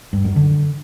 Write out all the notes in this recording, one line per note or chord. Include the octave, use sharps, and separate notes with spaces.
G2
F#2
D3